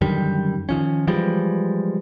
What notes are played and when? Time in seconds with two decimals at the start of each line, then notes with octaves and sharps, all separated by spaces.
0.01 F#2 D3 D#3 G3
0.69 D#3 F3 C#4
1.07 E3 F3 G3 G#3